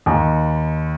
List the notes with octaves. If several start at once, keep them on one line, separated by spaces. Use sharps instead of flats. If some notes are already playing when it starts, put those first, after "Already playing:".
D#2